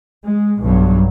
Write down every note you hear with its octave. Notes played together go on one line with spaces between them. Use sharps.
G#3
B1 G2 F#3